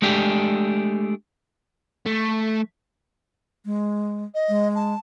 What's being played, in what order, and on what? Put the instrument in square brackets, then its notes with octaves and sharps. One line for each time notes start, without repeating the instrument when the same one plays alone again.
[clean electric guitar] G#3 A3 D4 G4 G#4
[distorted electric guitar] A3
[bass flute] G#3
[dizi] D#5
[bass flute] G#3
[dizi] A5